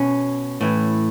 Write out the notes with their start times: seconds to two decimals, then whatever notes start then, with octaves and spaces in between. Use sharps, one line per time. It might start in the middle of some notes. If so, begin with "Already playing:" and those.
Already playing: B2 C#4
0.61 A2 E3